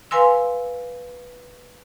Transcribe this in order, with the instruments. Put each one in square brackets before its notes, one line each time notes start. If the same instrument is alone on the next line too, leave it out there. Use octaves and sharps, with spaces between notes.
[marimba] B4 F5 G#5 C6 E6